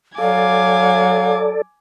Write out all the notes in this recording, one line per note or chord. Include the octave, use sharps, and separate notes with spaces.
F#3 A4 D5 F5 G#5 D6